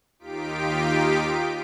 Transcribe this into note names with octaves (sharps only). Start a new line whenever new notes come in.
D#2 D#4 F4 G4 B6 D7